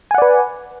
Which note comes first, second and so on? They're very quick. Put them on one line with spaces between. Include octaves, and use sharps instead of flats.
G#5 F#5 D5 B4